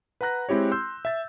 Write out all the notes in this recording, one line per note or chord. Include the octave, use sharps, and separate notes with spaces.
B4 F#5 A#5 F#6 A#6
G#3 C4 E4 G4 C#5
C6 E6 G6
E5 A6